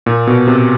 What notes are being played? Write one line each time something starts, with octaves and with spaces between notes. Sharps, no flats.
A#2
B2
C3